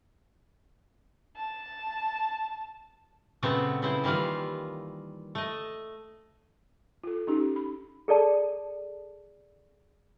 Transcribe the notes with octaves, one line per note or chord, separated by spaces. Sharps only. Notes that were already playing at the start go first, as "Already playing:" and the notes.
A5
A#2 C#3 F#3 A3 B3 C4
C#3 F#3 B3 E4 C5
D#3 E3 G3 A#3 F4
A3 D#5
F4 A4
C#4 D#4 G4
B5
G#4 A4 D5 A5